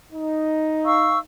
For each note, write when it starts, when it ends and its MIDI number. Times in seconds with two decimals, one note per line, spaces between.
0.12 1.22 63
0.86 1.19 77
0.86 1.19 85
0.86 1.19 88